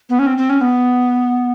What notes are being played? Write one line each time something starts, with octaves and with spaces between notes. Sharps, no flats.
B3
C#4
C4
C4
C#4
B3